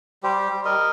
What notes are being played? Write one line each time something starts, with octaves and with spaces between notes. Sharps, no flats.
G3 G4 C5
G3
A#4 D#5